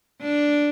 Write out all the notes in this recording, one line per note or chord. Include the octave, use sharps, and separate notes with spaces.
D4